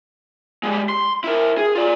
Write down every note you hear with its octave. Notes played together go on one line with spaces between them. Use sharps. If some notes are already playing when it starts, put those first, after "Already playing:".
G3 G#3
C6
E4 A#4
G#4
F4 D5